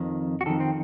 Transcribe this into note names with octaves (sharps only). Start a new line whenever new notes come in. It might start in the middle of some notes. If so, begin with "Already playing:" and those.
Already playing: F2 D#3
F#4
F2 D#3 A4
C4